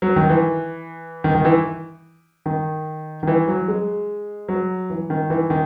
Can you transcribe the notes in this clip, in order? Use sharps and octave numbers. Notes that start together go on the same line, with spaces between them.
F#3
D#3
E3
D#3
D#3
E3
D#3
D#3
E3
F#3
G#3
F#3
E3
D#3
E3
D#3